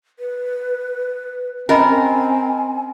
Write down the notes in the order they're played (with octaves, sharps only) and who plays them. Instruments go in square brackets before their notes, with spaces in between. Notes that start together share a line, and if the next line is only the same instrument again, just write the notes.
[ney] B4
[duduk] C4 [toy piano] C#4 D#5 B5 [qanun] A#4 [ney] G#5